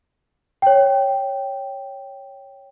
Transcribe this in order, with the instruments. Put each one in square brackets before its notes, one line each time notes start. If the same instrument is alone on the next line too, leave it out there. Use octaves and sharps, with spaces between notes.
[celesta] C#5 G5